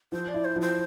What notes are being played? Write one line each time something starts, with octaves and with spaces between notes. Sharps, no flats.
F3 C5
D5
E4
C5
F3
C5